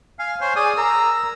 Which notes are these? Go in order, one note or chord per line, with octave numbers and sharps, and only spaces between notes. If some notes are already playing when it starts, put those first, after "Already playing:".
F5 G#5
C5 C#5 G#5
G#4 D5 G#5 D#6
A#4 A#5 E6